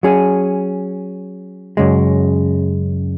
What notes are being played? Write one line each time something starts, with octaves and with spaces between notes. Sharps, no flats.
F#3 C#4 G#4
F#2 C#3 G#3